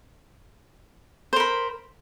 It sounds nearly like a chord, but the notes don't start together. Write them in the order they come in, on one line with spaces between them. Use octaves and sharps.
C5 A#4 B5